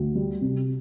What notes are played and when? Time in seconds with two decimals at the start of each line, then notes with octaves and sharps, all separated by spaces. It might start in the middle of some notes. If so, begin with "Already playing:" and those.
Already playing: D2
0.15 G3
0.41 C3